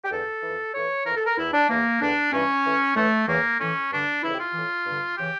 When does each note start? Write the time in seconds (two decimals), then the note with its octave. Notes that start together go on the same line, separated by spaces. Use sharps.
0.04 G4
0.11 E2 D3 A4
0.43 F2 E3
0.74 A2 E3 C#5
1.06 F2 E3 A#4
1.16 A4
1.26 A#4
1.38 E2 E3 E4
1.54 D4
1.69 E2 E3 A#3
2.01 E2 D3 D4
2.32 G2 E3 C#4
2.64 A2 E3
2.96 A2 E3 A3
3.27 E2 C#3 E3 A#3
3.60 A2 E3 C#4
3.91 G2 D3 D4
4.23 F2 C#3 E3 E4
4.34 G4
4.39 F4
4.54 A2 E3
4.86 G2 D3
5.17 C#3 E3 G4